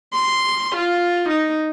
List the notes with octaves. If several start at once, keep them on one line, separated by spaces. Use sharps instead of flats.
C6
F4
D#4